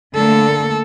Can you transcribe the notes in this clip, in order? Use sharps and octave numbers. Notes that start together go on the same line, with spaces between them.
D3 A3 A#3 A4